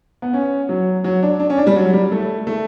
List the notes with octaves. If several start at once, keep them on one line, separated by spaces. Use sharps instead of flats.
B3
C#4
F#3
F#3
D4
D4
C#4
D4
G3
F#3
G3
A3
A3